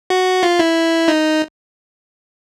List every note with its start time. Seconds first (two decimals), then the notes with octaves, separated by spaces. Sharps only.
0.10 F#4
0.43 F4
0.59 E4
1.08 D#4